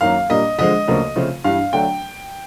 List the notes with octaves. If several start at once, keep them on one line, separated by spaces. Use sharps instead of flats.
F#2 D#3 F#3 A#3 C#4 F5
A#2 G3 A#3 D4 D#5
D3 F3 G#3 D#5
D2 C#3 F3 A#3
C#3 F3 A3 C4 F4
G2 E3 G3 F5
D3 F#3 A3 D4 G5